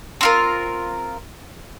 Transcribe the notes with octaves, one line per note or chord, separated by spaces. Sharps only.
C4 F4 A#4